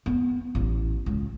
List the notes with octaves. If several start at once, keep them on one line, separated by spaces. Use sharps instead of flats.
B3
A1
C#2